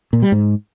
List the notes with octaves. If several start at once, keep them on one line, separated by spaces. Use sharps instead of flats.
A#2
G3
G#2